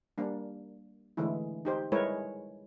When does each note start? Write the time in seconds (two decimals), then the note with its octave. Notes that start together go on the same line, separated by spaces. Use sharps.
0.18 G3 A#3 D4
1.17 D3 E3 G#3 A3 E4
1.65 D#4 G4 C5
1.92 G3 G#3 E4 A#4 B4 C#5